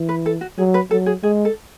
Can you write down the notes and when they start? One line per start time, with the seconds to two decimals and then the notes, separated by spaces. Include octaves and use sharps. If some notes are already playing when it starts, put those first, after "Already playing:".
Already playing: E3
0.09 B4
0.26 A4
0.41 F#4
0.58 F#3 G#4
0.74 B4
0.91 F#3 A4
1.06 G#4
1.23 G#3 G#4
1.45 A4